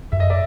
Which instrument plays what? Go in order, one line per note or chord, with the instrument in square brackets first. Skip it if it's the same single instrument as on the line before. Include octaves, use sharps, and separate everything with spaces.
[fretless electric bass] F#2 [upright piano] E5
[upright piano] D#5
D5 E5